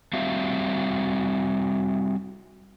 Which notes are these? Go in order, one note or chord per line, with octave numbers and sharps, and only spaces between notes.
G3 C4 F#4 E5 F5